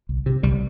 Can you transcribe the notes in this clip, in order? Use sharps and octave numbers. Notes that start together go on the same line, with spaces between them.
C2
C3
C2 G3